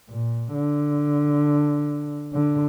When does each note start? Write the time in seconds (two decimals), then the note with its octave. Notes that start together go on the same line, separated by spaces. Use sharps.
0.09 A#2
0.54 D3
2.33 D3